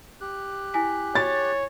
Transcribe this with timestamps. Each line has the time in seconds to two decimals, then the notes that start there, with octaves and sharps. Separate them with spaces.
0.21 G4 F#6
0.74 E4 G#5 B6
1.15 C#5 A6